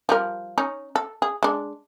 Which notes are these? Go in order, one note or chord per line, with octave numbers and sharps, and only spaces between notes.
F3 G3 A#4
C#4 D#4
A4
G#4
G#3 D4